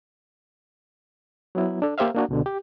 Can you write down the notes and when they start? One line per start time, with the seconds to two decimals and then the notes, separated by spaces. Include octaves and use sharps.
1.55 F#3 B3 E4
1.82 D4 A4
1.98 A#3 G4 C5 E5 F5
2.14 A#3 D4 F#4
2.29 C#2 B2 D3
2.46 G4